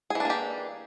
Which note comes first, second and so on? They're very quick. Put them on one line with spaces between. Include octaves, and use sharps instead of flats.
G#4 E3 D4 A#3 G4